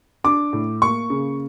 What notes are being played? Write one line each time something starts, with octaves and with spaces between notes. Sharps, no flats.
D4 D6
A2
A#3 C#6
C#3